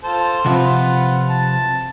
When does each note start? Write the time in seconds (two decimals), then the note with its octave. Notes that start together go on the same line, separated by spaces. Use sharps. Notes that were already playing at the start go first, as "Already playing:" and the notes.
0.04 F4 A4 C5
0.46 C3 F3 F4 B4 F#5
1.29 A5